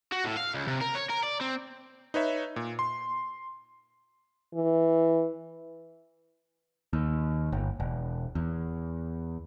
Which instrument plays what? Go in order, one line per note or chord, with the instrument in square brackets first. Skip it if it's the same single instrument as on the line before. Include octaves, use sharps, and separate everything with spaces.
[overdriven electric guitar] F#4
A2
F5
C#2
C3
A#4
C#5
A#4
D5
C4
[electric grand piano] D#4 B4 C#5 E5
A#2
C6
[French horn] E3
[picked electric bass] D#2
G1
E1
E2